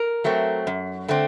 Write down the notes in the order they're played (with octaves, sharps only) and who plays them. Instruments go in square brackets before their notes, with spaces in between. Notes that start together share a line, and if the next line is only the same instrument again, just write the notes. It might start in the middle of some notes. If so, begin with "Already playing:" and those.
Already playing: [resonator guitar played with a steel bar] A#4
F#3 A3 C4
F#2
D3 A3 C4